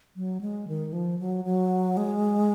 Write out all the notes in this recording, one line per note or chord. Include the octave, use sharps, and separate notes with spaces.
F#3
G#3
D#3
F3
F#3
F#3
G#3